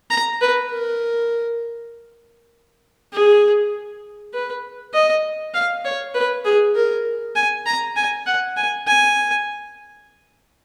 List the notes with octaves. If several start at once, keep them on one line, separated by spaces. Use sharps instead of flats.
A#5
B4
A#4
G#4
B4
D#5
F5
C#5
B4
G#4
A#4
G#5
A#5
G#5
F#5
G#5
G#5